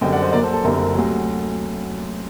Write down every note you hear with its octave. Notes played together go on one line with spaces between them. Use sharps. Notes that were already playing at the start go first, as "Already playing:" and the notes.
F#2 D3 G3 C4 D#5 G5
D5 F#5
C5 D#5
A#1 A#2 F#3 A#3 A#4 D5
A4 C5
A4
F#1 F#2 D3 G3 C4 A#4
D2 C3 F#3